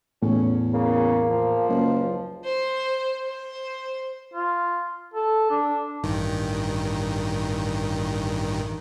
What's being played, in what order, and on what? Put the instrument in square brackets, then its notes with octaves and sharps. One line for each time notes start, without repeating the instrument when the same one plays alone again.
[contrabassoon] E2 [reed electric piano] A2 [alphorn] C#4
[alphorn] C#3 [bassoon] A#3
[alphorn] F3
[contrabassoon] F#1 [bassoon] C#2
[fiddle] C5
C5
[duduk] F4
A4
D4
[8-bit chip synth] A1 G2 D#3